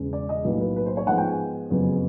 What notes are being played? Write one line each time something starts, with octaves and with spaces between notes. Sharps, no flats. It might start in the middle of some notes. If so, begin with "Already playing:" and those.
Already playing: E1 E2 C#3
D5
D#5
B1 A2 F#3 A#3 B4
B4
B4
C5
C#5
G#2 F3 G#3 B3 F#5
G5
G#5
F#1 F2 C#3 F#3 B3